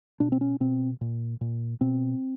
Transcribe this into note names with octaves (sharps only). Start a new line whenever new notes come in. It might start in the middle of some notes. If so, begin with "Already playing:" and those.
B2 D4
C4
C#4
B2 C4
A#2
A#2
B2 C4